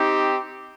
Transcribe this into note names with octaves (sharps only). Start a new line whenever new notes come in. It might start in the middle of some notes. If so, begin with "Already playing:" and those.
Already playing: C4 D#4 G4